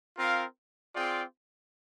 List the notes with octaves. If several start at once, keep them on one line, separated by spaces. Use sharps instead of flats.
C4 F4 A#4 F5
C4 F4 G#4 D5 G5